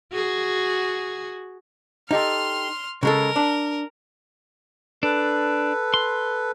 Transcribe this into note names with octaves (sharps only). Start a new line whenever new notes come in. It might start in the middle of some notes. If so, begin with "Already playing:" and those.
F#4 G#4
D#4 G4 A4 C6 F6
C#3 G#3 A4 A#4
D4
D4 A4 B4
C6